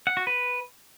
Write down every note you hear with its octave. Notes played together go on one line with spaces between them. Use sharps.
F#5
F#4
B4